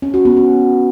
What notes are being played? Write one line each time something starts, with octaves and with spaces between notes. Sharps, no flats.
C#4
F#4
B3
C#4